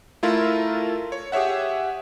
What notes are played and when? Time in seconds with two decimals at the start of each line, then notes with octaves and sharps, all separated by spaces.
0.23 A3 E4 F4 A4 A#4
1.12 C#5
1.32 G4 G#4 C#5 E5 F#5